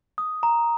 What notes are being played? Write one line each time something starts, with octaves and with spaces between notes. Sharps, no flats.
D#6
A#5